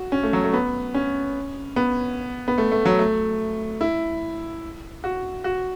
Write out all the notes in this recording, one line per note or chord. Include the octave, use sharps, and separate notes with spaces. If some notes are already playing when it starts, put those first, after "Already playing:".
Already playing: F#4
C#4
A3
F#3
A3
B3
C#4
B3
B3
A3
A3
F#3
A3
E4
F#4
F#4